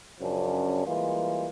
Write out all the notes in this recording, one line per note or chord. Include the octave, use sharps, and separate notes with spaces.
F#2 C#3 F3 C#4 D4
E3 G3 G#3 A#3 F4